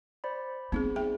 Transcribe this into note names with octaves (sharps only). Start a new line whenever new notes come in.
C5 D5 B5
B3 C4 D#4 G#4
G#4 E5 G5